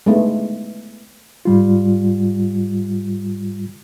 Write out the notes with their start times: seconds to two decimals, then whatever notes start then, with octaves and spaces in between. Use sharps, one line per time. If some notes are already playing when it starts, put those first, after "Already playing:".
0.06 G#3 A3 B3 D#4
1.45 G#2 G3 F4